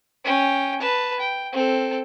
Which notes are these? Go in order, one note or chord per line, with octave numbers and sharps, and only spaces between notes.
C#4 G5
B4 A5
G5
C4 A4